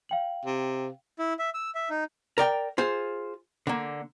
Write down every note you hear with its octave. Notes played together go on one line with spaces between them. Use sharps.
F5 G5 F#7
C3
E4
E5
E6
E5
D#4
A#4 D5 G5
F4 G#4 C5
D3 A#3